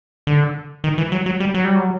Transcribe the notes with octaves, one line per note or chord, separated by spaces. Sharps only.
D3
D#3
E3
F#3
F#3
G3
F#3
G3
F#3